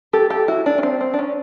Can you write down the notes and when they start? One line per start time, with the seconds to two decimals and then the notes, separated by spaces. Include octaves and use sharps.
0.13 G4 A4
0.30 G4 A4
0.48 E4 F#4
0.66 D4
0.78 C#4
0.83 C4
1.01 C4
1.14 D4
1.19 C#4